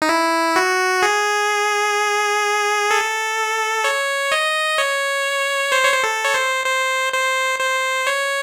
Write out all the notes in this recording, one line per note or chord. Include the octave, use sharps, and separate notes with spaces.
D#4
E4
F#4
G#4
A4
C#5
D#5
C#5
C5
C#5
C5
A4
C#5
C5
C5
C5
C5
C#5